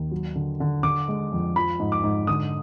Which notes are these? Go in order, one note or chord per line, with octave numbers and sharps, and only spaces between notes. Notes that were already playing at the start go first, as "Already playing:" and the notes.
Already playing: D#2
F#3
D3
D3
D3 D6
G#3
F2
F3 B5
G#2
D6
G#2
D3 D#6